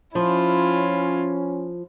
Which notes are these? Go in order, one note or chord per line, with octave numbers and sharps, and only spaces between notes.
F3 C#4 E4 F4